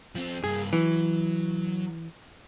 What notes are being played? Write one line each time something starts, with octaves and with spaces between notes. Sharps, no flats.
F3 C4
G2 A#3 G#4
E3 F#3